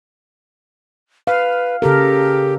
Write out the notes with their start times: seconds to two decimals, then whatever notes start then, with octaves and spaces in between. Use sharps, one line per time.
1.27 B4 F5
1.82 C#3 G4 A4 A#4